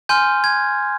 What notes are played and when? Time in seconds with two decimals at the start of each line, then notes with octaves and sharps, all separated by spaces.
0.09 G#5 C6 F6 G6
0.44 G#6